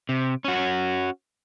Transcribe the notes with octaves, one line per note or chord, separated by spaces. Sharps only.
C3
C#4 F#4